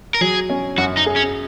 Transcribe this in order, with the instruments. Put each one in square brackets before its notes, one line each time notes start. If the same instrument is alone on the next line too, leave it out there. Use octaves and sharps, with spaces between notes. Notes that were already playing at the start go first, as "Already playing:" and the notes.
[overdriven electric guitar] A#4
[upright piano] F#3 [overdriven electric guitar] G#4
[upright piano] C#4
[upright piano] F#2 [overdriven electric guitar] F#4
[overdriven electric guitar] D#4
[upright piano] G#4
[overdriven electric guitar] C#4